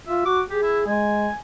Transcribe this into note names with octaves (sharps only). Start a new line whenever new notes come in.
F4 E5
F#4 D6
G4 G#4
E4
G#3 G#5